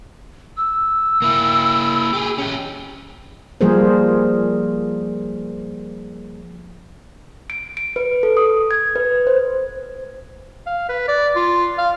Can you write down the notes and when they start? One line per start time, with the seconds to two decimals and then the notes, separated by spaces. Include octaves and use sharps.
0.57 E6
1.22 A#3 E4
2.13 G4 G#4
2.38 C#4 G4
3.61 F3 G3 A#3 G#4 A#4 C5
7.50 D7
7.77 D7
7.96 B4
8.23 A4
8.37 D#6
8.71 G#6
8.96 B4
9.27 C5
10.66 F5
10.89 B4
11.08 D5
11.36 F4
11.78 F5